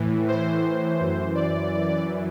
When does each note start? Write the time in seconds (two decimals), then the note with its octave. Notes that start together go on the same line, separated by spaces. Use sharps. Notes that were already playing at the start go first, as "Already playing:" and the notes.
Already playing: A2 E3
0.28 C5
0.99 F#2 E3
1.35 D5